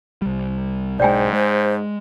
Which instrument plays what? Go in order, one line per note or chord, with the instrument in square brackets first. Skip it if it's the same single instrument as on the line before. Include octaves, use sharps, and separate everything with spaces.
[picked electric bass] C2 G3
[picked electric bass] B1 G#3 [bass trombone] G#2 [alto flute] C5 [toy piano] D5 G5 G#5
[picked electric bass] G#3 [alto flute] C5